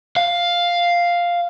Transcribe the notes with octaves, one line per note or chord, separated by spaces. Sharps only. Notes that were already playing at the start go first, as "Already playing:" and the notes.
F5